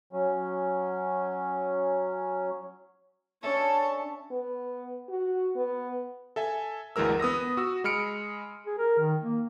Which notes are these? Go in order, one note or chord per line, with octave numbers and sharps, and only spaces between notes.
F#3 C#4
C#4 D4 A4 C#5 E5 A5
B3
F#4
B3
A4 E5 G#5
G1 D2 E3 G#3 A#4 E6
B3 D#6 E6 A#6
F#4 E6
G#3 B5 F6 C#7 D7
G#4
A#4
D#3
A#3